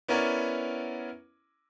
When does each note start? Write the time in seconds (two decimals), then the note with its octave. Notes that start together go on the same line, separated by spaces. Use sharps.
0.08 B3 C#4 E4 A#4 C#5 D5